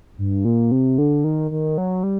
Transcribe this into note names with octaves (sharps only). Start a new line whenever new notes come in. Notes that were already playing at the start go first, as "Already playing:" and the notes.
G2
A#2
C3
D3
D#3
D#3
F#3
G3